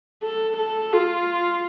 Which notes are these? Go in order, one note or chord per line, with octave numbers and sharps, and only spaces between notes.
A4
A4
F4